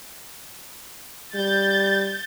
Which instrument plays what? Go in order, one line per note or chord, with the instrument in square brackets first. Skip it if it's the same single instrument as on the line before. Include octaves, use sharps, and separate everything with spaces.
[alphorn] G3 [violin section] G6 A6